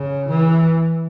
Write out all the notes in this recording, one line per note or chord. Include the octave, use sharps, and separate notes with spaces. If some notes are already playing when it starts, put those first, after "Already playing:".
Already playing: C#3
E3